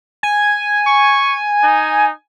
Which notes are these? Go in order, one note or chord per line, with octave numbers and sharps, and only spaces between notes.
G#5
C#6
D#4